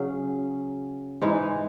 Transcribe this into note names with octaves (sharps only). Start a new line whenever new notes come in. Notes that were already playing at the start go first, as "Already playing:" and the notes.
Already playing: C#3 F#3 C#4 G#4
G#2 E3 G#3 D#4